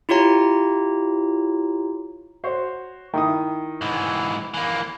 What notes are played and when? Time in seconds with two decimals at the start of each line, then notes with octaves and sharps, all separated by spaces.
0.09 E4 F4 G4 C#5 A#5
2.44 F#4 C5 C#5
3.14 D#3 E4 D#6
3.82 G#2 E3
4.54 E3 A#3